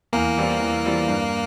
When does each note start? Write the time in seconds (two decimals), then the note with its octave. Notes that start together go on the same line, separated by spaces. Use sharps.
0.13 E2 A#3
0.37 E3 G3 C4 F4
0.60 E2
0.85 E3 G3 C4 F4
1.08 G2